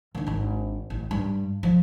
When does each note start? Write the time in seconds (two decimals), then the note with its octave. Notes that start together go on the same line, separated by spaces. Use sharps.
0.15 D#3 D4
0.27 G#1 D4
0.90 A1
1.11 G2
1.63 F3